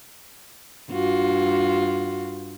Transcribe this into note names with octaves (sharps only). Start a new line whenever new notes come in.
G2 F4 F#4